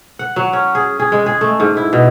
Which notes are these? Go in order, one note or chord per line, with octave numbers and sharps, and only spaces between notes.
F#5
F#3
C#4
G#4
G#4
G#3
G#4
A3
G#2
E4
B2